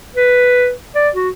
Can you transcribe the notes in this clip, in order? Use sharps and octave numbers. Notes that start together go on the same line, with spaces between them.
B4
D5
F#4